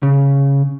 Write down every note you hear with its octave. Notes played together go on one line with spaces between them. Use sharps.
C#3